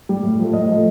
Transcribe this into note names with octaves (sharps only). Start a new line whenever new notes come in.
G3
A2
F3 A3
A2 D#5
F3 A3